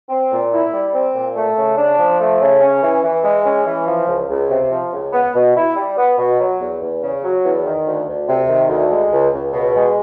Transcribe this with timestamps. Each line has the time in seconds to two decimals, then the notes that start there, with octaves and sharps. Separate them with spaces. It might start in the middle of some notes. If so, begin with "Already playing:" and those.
0.09 C4
0.31 A#2
0.51 E4
0.72 G3
0.94 C4
1.14 A#2
1.36 A3
1.57 C#3
1.77 D4
1.99 F3
2.20 A3
2.41 C#3
2.61 C#4
2.82 E3
3.03 E3
3.24 G#3
3.45 C#4
3.66 E3
3.87 F3
4.08 C#2
4.29 C#2
4.50 C3
4.71 F3
4.92 C#2
5.13 B3
5.34 B2
5.56 E4
5.76 G3
5.98 B3
6.18 B2
6.39 F#3
6.60 E2
6.81 E2
7.02 C#3
7.23 F#3
7.43 E2
7.65 D#3
7.86 D2
8.07 D2
8.28 C3
8.48 D#3
8.69 D2
8.90 G#3
9.12 C#2
9.33 C#2
9.53 B2
9.75 G#3